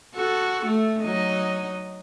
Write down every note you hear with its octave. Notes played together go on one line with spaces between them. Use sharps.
F#4 A4
A3
F#3 D#4 D#5